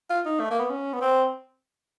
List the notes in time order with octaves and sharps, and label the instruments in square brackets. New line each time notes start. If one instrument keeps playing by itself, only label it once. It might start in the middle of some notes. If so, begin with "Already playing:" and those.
[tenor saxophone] F4
D#4
A3
A#3
B3
C#4
B3
C4